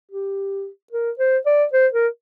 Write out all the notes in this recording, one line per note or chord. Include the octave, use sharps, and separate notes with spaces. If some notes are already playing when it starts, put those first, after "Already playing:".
G4
A#4
C5
D5
C5
A#4